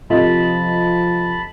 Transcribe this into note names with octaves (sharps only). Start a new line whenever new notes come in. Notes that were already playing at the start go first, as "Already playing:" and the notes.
C3 F3 F4 A4 D#5 A5 B5